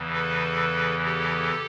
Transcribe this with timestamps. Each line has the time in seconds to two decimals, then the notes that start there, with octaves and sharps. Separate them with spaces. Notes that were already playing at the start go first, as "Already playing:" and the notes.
Already playing: E2 C#3 E3
0.13 A4 B4
1.05 G4 A4